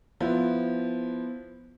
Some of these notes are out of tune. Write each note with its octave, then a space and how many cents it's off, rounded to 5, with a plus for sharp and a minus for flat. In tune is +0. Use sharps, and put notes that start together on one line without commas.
F3 +0 B3 +5 E4 +0